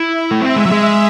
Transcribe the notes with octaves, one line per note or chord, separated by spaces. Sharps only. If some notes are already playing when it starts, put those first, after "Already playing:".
Already playing: E4
E5
A3
C4 E5
G#3
F#3
G#3